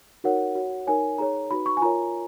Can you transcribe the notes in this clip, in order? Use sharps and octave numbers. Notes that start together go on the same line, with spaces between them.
D#4 F#4 A#4 C#5 F#5
F#4 C#5
D#4 A#4 C#5 G#5
D#4 G#4 C#5 A#5
D#4 F#4 B4 B5
C#6
G#5
F4 A#4 C#5 A#5